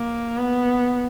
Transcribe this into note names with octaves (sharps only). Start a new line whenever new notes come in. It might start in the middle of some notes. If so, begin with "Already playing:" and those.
Already playing: A#3
B3